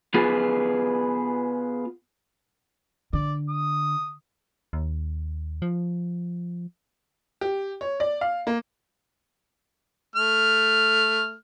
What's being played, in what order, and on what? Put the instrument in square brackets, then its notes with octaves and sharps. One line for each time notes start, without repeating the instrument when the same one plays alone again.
[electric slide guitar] B3 F4 G#4 B4
[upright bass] D3 [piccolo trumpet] D5
[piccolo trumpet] D#6
[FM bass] D#2
F3
[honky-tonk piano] G4
C#5
D5
F5
A#3
[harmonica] A3 F6